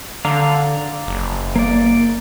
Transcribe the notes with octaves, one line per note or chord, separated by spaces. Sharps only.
D3 D5 F5 A#5
F#1
A#3 D5